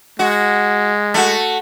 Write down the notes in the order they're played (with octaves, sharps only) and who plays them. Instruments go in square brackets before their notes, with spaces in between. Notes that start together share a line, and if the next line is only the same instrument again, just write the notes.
[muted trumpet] G#3 [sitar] F#4
[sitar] A3 F#4